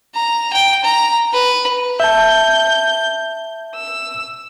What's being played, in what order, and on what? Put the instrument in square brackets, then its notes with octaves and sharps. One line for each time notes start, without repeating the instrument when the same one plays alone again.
[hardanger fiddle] A#5
G5
A#5
B4
[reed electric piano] E5 A5 [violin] G6
[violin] E6